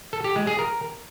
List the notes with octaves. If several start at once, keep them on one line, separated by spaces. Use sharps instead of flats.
A4
G4
G#3
G#4
A#4